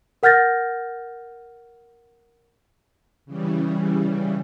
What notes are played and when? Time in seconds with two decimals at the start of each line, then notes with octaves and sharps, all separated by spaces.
0.23 A#4 F#5 F6 G6 A6 A#6
3.26 C#3 E3 G3